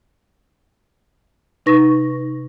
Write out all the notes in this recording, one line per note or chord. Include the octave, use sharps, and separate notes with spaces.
C3 D#4 B4 C#6 A#6